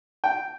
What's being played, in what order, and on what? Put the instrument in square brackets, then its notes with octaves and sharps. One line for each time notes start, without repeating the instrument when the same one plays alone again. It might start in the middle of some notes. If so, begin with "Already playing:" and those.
[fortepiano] G5